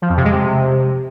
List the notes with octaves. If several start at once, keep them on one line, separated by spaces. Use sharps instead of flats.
F3
F2
C3
G#3
C3